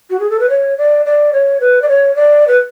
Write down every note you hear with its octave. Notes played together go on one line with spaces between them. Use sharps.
F#4
G#4
A4
B4
C#5
D5
D5
C#5
B4
D5
C#5
D5
B4